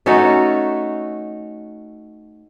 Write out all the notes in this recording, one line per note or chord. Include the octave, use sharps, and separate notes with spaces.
A3 C#4 D#4 F#4